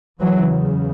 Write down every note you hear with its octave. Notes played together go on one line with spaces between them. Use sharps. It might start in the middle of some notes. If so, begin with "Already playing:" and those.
E2 C#3 E3 F#3